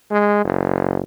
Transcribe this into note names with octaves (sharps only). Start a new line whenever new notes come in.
G#3
F#1